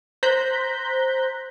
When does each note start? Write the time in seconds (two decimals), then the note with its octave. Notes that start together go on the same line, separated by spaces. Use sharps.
0.23 C5 A#5 F#6 G6 A#6 B6